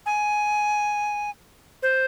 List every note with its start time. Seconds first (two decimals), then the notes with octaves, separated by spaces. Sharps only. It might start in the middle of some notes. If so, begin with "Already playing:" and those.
0.06 G#5
1.83 C5